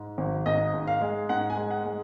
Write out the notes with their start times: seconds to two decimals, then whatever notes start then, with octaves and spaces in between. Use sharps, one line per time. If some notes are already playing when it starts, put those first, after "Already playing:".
Already playing: G#2
0.18 G#1
0.46 G#2 D#5
0.74 G#2
0.87 F5
1.01 G#3
1.29 G#2 F#5
1.50 G#5
1.57 G#3
1.71 F#5
1.85 G#3